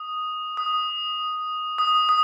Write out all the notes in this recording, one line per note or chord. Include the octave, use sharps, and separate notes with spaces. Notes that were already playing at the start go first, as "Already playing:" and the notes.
Already playing: D#6
D#6
D#6
D#6